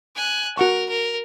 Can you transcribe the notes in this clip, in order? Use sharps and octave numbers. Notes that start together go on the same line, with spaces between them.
G#5 F#6
F#4 A#4 F#5 C#6
A#4